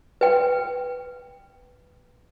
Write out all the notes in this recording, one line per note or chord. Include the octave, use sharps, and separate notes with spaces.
B4 G5